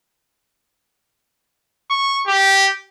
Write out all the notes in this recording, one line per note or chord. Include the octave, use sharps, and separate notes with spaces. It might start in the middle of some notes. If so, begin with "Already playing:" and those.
C#6
G4